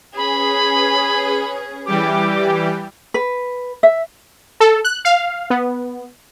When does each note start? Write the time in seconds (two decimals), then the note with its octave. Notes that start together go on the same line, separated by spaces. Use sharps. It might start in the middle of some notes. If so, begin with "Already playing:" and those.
0.17 C#4 G#4 B4 B5
1.86 E3 G3 G4 D6
3.14 B4
3.83 E5
4.60 A4
4.84 F#6
5.05 F5
5.50 B3